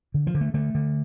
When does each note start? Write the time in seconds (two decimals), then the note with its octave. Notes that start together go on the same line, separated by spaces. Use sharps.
0.14 D3
0.27 F3
0.34 D3
0.41 A3
0.54 D3 A3
0.75 D3